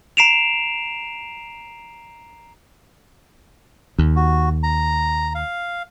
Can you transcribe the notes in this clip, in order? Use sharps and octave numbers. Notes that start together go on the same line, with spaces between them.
A#5 C7 D7 E7 F7
D#2
F#4
A#5
F5